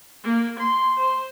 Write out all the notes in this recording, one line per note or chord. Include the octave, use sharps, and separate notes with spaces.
A#3
C6
C5